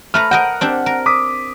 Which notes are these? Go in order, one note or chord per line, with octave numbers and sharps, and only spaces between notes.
A3 B4 A#5 F6
A#4 D#5 F#5 G5
C4 D4 G4
A#4
D6 D#6 B6